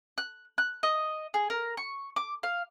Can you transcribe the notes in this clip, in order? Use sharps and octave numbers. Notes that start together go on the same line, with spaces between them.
F#6
F#6
D#5
G#4
A#4
C#6
D6
F5